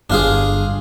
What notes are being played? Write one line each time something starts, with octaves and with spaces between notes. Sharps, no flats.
G1 D4 F4 G#4